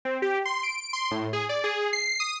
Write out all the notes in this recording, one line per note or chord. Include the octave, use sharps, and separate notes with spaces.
C4
G4
C6
D7
C6
A2
G#4
D5
G#4
C7
D#6